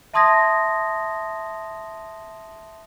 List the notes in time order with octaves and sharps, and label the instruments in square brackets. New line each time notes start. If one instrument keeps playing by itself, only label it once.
[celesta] E5 A5 C6 D#6 G#6 A#6